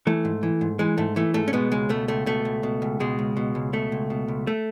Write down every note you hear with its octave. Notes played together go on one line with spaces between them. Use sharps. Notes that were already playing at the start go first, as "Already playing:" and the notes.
E3 A3
G#2
E3
G#2
E3 G#3
G#2 A3
E3 A3
G#2 A3
C#4
B2 G#3 B3
C#2 G#3
B2 A3
C#2 A3
B2 A3
C#2
B2
C#2
B2 G#3
C#2
B2
C#2
B2 A3
C#2
B2
C#2
A3